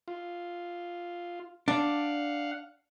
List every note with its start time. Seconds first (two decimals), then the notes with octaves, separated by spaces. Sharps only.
0.08 F4
1.68 D4 F5 F#5